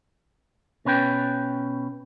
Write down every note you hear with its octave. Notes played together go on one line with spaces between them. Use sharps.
B2 C#4 B4 G5